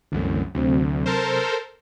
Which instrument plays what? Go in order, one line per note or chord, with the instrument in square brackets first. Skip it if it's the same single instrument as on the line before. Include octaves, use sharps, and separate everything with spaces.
[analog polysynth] C2 F#2 [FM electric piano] D3 E3 A3
[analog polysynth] D2 [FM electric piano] C3 F#3 C4
[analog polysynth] A4 A#4 C5